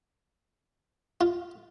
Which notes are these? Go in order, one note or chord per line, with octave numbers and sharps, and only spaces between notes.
F4